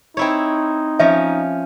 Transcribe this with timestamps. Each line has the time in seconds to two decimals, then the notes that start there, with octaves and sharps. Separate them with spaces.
0.17 C4 D#4 E4 C#5
0.99 F3 C#4 E5